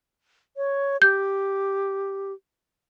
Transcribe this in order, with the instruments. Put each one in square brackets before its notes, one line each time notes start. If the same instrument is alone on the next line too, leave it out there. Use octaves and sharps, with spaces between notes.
[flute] C#5
[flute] G4 [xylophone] G6